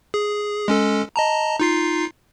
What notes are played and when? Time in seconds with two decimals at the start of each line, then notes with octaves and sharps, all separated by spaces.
0.14 G#4
0.68 G#3 C#4 A4
1.16 D#5 A5 A#5
1.60 D#4 F4 C7